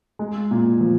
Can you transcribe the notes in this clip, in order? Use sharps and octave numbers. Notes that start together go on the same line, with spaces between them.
G#3
A#2
F3